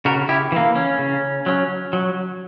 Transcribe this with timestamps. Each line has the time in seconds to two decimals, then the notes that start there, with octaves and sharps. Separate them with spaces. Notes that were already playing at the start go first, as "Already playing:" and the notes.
0.05 C#3 F#4 A#4
0.29 E4 G4
0.52 E3 A#3
0.76 C#4
0.99 C#3
1.46 F#3 C#4
1.93 F#3